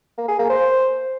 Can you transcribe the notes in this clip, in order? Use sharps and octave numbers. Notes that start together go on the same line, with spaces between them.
A#3
G#4
A#3
C5